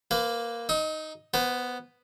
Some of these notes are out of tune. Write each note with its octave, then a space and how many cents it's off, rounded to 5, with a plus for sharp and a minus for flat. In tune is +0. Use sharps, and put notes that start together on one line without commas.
A#3 +0 B4 +30
D#4 +0 D#6 +45
B3 +0 C5 -25